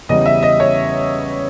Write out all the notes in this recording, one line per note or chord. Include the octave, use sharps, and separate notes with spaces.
E2 C#3 G3 D#5
E5
D#5
C#5